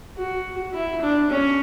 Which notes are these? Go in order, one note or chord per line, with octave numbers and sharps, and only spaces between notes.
F#4
E4
D4
C#4